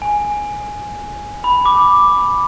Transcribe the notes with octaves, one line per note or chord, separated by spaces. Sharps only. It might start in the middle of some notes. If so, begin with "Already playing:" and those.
G#5
B5
D6